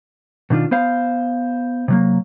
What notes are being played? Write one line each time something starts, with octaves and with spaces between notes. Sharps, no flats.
B2 D#3 D4 F4
B3 C5 F5
C3 F#3 A#3